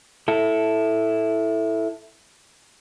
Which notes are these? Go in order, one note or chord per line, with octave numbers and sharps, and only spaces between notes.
E4 A4